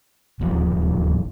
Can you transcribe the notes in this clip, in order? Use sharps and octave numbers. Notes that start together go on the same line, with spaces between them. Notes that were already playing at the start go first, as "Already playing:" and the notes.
D1 A1 D#2 F3